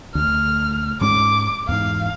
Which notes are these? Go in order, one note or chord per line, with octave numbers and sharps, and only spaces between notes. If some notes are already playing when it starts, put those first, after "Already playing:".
D2 F6
G#2 G#3 C#4 D6
E2 G#2 F5